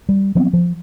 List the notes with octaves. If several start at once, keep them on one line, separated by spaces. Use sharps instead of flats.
G3
F3 F#3 B3 C4
F3